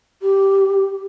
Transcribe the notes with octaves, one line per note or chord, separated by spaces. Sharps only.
G4